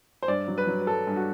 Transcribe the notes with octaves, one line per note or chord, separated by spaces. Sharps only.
C5
G2 D5
F#3
B4
F#3
B4
G2 A4
G2
F#4